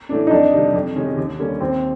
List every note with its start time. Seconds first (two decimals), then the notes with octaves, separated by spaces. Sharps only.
0.09 A2 E3 A3 D4
0.27 D#4
0.31 F2 D4
0.53 C3 D#3 G3
0.74 F2
0.96 C3 D#3 G#3 C#4
1.17 D#2
1.39 D3 G3 A#3 C#4
1.61 D#2 C4